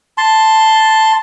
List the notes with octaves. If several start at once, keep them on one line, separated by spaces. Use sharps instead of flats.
A5 C6